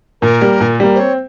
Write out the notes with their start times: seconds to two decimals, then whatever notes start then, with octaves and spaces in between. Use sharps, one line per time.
0.22 A#2 A#4
0.41 G3 A#3
0.60 A#2
0.80 G3 A#3
0.95 C5
0.99 C4 C#5